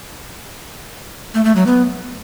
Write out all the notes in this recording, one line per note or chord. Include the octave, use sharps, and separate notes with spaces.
A3
A3
F#3
B3